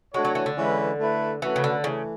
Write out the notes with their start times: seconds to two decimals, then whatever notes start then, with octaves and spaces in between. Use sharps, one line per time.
0.14 G#3 A3 D4 F#4 C#5
0.25 F#3
0.35 E3
0.46 D3
0.57 E3 G#3 C#4 E4 B4
0.99 A3 E4 B4
1.42 E3 A3 C#4 F#4 B4
1.56 C#3
1.64 D3
1.84 C#3 E3 A3